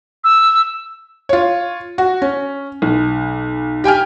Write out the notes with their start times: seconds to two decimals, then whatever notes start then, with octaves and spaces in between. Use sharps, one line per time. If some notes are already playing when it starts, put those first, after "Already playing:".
0.24 E6
1.29 F4 C#5
1.98 F#4
2.22 C#4
2.82 B1
3.84 G4 G5 G#5 F6